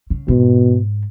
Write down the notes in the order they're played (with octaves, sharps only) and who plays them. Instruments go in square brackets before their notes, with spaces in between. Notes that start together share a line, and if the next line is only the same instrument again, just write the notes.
[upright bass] C#3
[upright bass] G#2 [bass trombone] B2